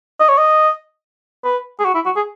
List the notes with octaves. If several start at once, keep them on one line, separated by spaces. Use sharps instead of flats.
D#5
C#5
D#5
B4
G#4
F#4
E4
F#4
G#4